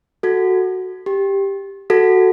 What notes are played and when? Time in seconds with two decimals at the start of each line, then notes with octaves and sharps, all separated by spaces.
0.23 F#4 A4
1.06 G4
1.90 F#4 A4